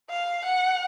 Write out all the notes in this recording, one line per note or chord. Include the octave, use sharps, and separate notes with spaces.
F5
F#5